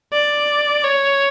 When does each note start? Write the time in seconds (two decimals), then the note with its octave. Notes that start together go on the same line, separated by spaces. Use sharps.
0.13 D5
0.84 C#5